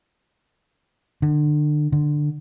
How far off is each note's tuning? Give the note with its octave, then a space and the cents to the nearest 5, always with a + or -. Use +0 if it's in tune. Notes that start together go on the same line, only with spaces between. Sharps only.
D3 +30
D3 +15